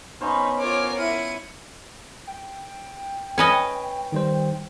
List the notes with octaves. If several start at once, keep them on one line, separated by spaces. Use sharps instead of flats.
B3 C#4 D#4 C5 B5 C#6 F6
F4 A#4 C#5 G#5 D6
E4 C#7 D#7
G5
C#4 B4 D#5
D#3 G3 C5